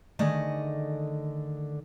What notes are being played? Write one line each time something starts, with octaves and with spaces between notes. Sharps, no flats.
D3 D#3 A3 G#4 D5 D#5